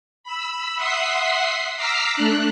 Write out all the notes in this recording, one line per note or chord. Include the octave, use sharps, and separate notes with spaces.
B5 E6
E5 F#5 C6 D#6 B6 C7
A#5 D6 E6 F6 B6 C7
A3 D4 F#6